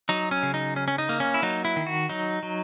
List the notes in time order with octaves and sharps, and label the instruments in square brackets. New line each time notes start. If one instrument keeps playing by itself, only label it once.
[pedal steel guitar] F#3 D#4
C#4
C#3
D#4
C#4
C#4
D#4
A#3
C#4
E4
F#3 D#4
E4
D#3
F#4
F#3 D#4
F#3